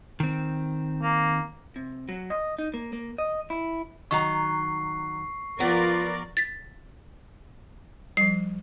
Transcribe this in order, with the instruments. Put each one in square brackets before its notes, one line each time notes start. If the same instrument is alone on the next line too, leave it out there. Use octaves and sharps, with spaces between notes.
[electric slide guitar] D#3 C4
[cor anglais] A#3
[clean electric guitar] C3
F#3
D#5
D#4
A#3
A#3
D#5
E4
[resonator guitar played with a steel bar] D#3 F#3 A#5 [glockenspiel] C#6 C7
[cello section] F3 A#4 D5 [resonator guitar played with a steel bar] B3 [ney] F4
[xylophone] A6 B6
[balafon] F3 G3 [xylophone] C7